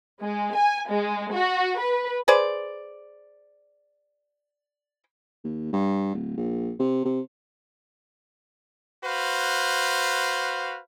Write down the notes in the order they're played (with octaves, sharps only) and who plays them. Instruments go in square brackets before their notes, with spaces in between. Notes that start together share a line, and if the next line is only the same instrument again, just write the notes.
[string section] G#3
G#5
G#3
F#4
B4
[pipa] G#4 B4 C5 D5
[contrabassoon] D#2
G2
D1
A#1
C3
C3
[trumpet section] F#4 B4 C5 F5